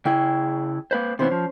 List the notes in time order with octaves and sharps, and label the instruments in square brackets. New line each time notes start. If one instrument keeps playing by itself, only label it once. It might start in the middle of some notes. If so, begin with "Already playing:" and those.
[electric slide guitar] C#3 E4 G#4 [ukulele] G5
[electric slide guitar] A#3 B4 C5
[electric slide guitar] C3 E3 B3 [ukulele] C#4 C5
[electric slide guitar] F3